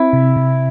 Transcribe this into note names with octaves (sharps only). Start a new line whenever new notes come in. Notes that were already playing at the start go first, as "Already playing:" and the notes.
Already playing: C4 E4
C3
C3